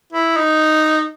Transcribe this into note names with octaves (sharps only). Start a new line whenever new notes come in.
E4
D#4